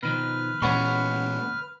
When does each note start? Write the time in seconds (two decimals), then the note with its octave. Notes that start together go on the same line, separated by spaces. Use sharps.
0.03 B2 D#3 F3 B4 F6
0.62 A#2 E3 G#3 B3 C#4 F#5 B5 C#6